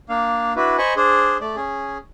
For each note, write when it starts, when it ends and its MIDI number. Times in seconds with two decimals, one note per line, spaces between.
0.09 0.53 58
0.09 0.53 62
0.09 0.53 77
0.56 0.77 62
0.56 0.77 64
0.56 0.77 66
0.56 0.77 71
0.78 0.94 72
0.78 0.94 75
0.78 0.94 80
0.78 0.94 83
0.78 0.94 85
0.96 1.37 62
0.96 1.37 68
0.96 1.37 72
1.41 1.56 57
1.41 1.56 74
1.56 1.98 61
1.56 1.98 68